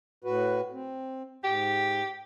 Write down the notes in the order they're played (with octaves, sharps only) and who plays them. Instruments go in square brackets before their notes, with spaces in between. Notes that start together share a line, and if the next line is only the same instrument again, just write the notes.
[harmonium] A2 F#4 B4
C4
[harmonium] G#2 [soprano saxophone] G4